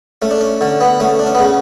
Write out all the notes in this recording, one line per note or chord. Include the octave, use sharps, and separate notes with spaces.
A3 C#4
D4
C#4
D3 C#4
B3
A3 C#4
D4
C#4
B3
C#3 C#4